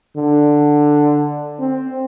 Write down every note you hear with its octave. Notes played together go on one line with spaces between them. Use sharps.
D3
C4